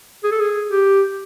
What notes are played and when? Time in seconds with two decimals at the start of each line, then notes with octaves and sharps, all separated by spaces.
0.24 G#4
0.31 A4
0.40 G#4
0.70 G4